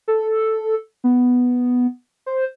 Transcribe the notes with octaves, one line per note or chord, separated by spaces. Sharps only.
A4
B3
C5